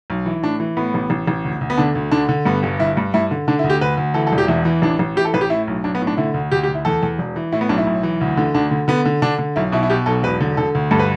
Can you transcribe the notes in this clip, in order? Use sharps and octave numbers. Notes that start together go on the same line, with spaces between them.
B1
E3
A2 D4
E3
A2 B3
A1
A1
A1
D2
D2
B3
D3 D4
D2
D3 D4
D3
G2 B3
G1
G1 E4
G2
G2 E4
D3
D3 D4
E4
D2
G4
D2 B4
D2
E3 A4
A4
E1
G4
E2 E4
E3
A1 D4
A1
E3 G4
A4
A1 B4
G4
A2 E4
B1
B1 D4
B3
A2
D4
D3 E4
D2
D2 G4
G4
D2
E4
E2 A4
E2
E1
E3
A2 E4
B3
B1 D4
E4
B1
E3
D2
D3
D2 D4
D3
D3 B3
D3
D3 D4
D3
B1 E4
B2 E4
E4
B2 G4
B1 A4
E1 B4
D3
D3 A4
D2
G2 A4
B4